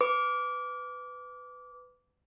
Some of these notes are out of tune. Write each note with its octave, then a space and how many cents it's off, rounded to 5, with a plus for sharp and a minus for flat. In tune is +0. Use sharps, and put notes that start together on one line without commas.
B4 +20 D6 -20